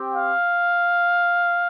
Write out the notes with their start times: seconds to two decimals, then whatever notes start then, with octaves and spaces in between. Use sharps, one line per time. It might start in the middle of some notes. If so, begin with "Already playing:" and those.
Already playing: C4 G4
0.14 F5